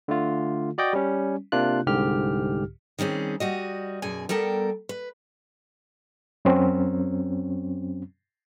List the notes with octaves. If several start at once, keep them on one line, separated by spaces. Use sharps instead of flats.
D3 A3 F4
F#4 D5 D#5 G5
G3 C#4
C3 A#3 D4 F4 F#6
C2 G#2 D3 G4 F6
D#3 G3 C4 C#4 G#4
G3 F#4 D#5
F#2 B2 G#4 G#5
G3 B3 A4 A#4 G5
B4
F#2 F#3 C4 C#4